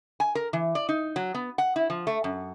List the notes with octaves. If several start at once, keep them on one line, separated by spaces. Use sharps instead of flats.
G#5
A#4
E3
D5
D#4
F#3
B3
F#5
E4
F3
A3
F#2